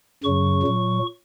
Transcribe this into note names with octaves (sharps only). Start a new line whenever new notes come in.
F#2 C#3 F#3 C#6
A#2 F#3